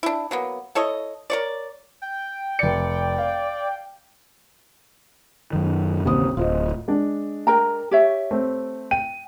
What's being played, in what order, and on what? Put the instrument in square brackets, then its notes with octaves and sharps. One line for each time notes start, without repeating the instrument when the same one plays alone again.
[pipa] D4 E4
F#3 A#3 B3
E4 A4 C#5 D#5
A#4 C#5 D5
[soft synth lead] G5
[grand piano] F1 C#7 [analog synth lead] D5
[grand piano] F5
[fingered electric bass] F#2 D#3
[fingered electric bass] A1 C#3 [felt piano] D#2 C4 D#6
[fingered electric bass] D1 [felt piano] F4 C5 D#5
[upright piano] G#3 D4
[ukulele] A#4 G5 A#5
G4 C#5 E5
[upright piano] A3 C4
[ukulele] G5 [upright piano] D#7